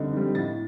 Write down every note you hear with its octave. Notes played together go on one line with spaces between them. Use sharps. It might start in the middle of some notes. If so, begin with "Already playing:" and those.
Already playing: D3 G3 C4 D#4
G3 C4 D#4
A2 A6